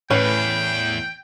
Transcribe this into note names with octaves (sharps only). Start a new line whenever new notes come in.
E2 A2 C#4 B4 G5